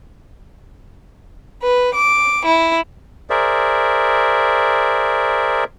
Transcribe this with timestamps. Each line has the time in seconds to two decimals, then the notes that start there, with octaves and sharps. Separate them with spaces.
1.62 B4
1.93 D6
2.43 E4
3.30 G#4 A#4 C5 D5 E5